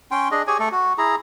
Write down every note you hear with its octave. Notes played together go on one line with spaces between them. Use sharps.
C#4 G5 C6
D4 G#4 D#5
G4 G#4 C#5 G#5
A3 A4
F#4
E4 G#4 A#5